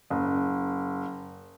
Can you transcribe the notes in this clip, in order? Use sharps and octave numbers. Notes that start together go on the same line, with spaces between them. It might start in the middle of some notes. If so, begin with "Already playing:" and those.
F#1